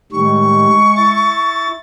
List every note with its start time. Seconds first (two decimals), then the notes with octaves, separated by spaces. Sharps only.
0.12 A2 D#3 G3 G#3 C#6
0.96 E4 A6